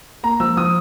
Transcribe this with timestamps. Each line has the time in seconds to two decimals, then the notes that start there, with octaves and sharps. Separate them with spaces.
0.23 A#3 A#5
0.40 F3 E6
0.57 F3 D#6